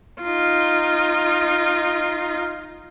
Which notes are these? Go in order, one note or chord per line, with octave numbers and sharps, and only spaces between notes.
D#4 F4